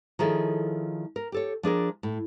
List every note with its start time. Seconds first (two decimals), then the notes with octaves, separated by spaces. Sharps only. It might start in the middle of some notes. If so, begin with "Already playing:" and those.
0.19 D#3 F3 E4 G#4 A4 C#5
1.16 A#4
1.32 G4 A4 C#5
1.63 F3 D4 G#4 A#4
2.03 A2